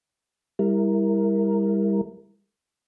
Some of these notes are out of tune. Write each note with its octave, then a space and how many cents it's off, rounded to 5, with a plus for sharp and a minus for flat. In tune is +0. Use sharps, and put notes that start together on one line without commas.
G3 +30 E4 +0 A#4 +0